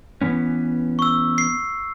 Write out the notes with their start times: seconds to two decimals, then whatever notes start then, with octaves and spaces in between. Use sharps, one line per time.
0.21 E3 B3 C#4
0.99 C#6 E6
1.38 C7